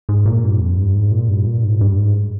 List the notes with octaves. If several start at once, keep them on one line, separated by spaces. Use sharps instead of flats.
G#2
A#2
G2
F2
G2
G#2
A#2
G2
A#2
G#2
G2
G#2